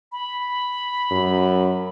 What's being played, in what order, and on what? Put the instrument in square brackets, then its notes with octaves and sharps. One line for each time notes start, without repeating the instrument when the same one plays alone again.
[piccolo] B5
[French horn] F#2